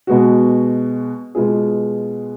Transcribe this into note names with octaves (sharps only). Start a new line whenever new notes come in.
B2 G#3 B3 F#4
B2 G#3 B3 F4 G#4